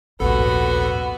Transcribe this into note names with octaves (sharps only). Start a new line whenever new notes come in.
A#1 D#2 G#2 B3 F#4 A4 B5